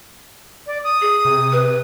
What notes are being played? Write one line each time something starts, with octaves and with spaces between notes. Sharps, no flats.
D5
D#6
G#4
C3
B4